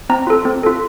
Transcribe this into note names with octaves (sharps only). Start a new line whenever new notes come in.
C4 A#5
F4 A4
C4
F4 A4